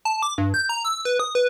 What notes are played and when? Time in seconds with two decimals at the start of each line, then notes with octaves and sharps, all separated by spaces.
0.05 A5
0.22 D6
0.38 G2
0.54 G6
0.69 A#5
0.85 E6
1.05 B4
1.20 D#6
1.35 B4